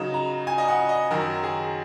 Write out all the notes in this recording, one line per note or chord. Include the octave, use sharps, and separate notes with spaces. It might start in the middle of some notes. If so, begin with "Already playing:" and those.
Already playing: C#3 F#3 D#4
A#5
G#5
D#5
F#5
D#5
F#2 D#3 F#3 A#4
G#4